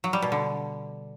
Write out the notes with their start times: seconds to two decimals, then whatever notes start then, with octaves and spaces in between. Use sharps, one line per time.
0.04 F#3
0.13 G3
0.22 B2
0.32 D3